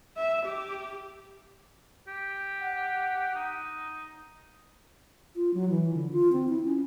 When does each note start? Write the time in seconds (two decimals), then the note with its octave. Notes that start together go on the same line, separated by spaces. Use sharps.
0.16 E5
0.45 G4
2.08 G4
2.62 F#5
3.35 D#4
5.36 F4
5.54 F#3
5.70 E3
5.94 D3
6.12 F4
6.32 C4
6.48 E4
6.65 C#4